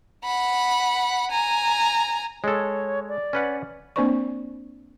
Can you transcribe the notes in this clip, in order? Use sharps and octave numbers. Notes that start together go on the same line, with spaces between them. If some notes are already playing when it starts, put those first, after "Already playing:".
F#5 B5
G#5 A#5
G#3 A4 C#5
D5
C#4 B4 F#5
A#3 C4 D4 C5 D5 C#6